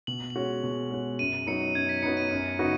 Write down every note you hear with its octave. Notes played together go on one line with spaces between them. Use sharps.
B2 F#7
F#7
G#3 C#4 F#4
B2
G#3 C#4 F#4
F#2 D#7
F#3 B3 D#4 C#7
F#2 G#6
B6
F#3 B3 D#4 C#7
D#7
F#2
C#3 B3 D#4 F#4